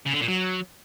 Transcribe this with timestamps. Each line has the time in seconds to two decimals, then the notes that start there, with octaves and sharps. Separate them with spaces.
0.06 C#3
0.14 D3
0.21 A#2
0.28 F#3